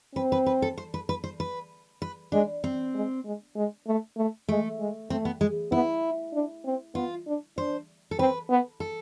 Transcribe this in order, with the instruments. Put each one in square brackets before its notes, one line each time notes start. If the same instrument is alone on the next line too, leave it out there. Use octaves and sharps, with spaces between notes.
[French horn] C4 [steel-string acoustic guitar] B4
[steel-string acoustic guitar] B4
B4
A4
C5
B4
B4
C5
B4
B4
[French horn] G#3 [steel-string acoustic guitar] D4
[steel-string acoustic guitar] C4
[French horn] G#3
G#3
G#3
A3
A3
[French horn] G#3 [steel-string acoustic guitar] A3
[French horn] G#3
[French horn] A3 [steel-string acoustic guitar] C4
[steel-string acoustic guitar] B3
G#3
[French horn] B3 [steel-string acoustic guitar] E4
[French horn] D4
C4
[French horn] B3 [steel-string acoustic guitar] F4
[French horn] D4
[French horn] D4 [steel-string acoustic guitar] C5
[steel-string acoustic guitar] A4
[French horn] C4 [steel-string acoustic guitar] B4
[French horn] B3
[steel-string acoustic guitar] A4